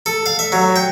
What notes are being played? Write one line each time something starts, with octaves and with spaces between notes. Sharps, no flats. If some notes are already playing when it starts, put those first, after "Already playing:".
A4
F5
E5
F#3
G5